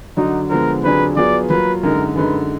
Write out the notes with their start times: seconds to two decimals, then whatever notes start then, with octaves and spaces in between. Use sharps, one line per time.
0.17 D3 F#3 D4 D#4 F#4
0.50 D3 F3 G#3 B3 A#4
0.83 F2 D3 F#3 D4 G#4 B4
1.16 F#3 B3 F4 G#4 B4 D5
1.49 F#3 A#3 F4 B4
1.83 F#2 D3 G#3 D#4 A#4
2.15 F#2 D3 G#3 D#4 B4